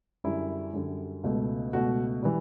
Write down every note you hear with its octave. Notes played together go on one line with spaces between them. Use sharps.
F#2 D3 G3 E4
F#2 D3 G3
C#2 B2 A3
C#2 B2 A3 F#4
E3 G3